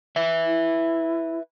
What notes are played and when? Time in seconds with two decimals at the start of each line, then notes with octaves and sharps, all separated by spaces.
0.16 B4 E5
0.46 E4